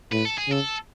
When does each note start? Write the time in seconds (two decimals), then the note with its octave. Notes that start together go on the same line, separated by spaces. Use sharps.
0.12 A2 B4
0.25 A4
0.38 G#4
0.48 C#3 A4